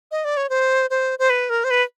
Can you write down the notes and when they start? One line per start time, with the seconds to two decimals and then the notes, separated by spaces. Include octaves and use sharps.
0.11 D#5
0.25 D5
0.37 C#5
0.50 C5
0.90 C5
1.19 C5
1.30 B4
1.50 A#4
1.64 C5
1.70 B4